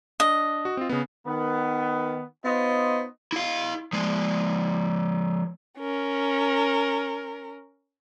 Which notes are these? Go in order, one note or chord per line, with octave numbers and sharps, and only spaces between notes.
D4 D#5
F#4
C4 F4
C#3 B3
D#3 B3
B3 D#4 F4 C5 D#5
E4 F5
F3 G#3
C#4 A#4